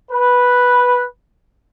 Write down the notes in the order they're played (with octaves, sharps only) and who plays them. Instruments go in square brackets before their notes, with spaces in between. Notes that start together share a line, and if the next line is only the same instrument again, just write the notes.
[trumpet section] B4